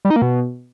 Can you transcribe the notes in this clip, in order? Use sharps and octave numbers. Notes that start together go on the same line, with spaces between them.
G3
D#4
A#3
B2